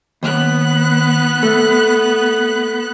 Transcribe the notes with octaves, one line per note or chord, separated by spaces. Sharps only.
D#2 B3 F#6
A3